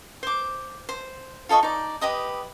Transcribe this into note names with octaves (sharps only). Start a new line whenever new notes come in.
C5 D6
C5
F4 A4 D#5 C#6
D#4 D5
G4 B4 D#5 D#6